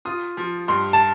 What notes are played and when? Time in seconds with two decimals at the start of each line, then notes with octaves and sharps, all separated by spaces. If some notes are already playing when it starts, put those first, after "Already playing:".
0.05 F4 D#6
0.37 F3
0.68 G2 C6
0.93 A5